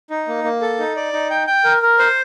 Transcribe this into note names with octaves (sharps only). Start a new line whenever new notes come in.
D#4
A#3
A#3
A4
D#4
D5
D#4
G5
G5
A#4
A#4
C5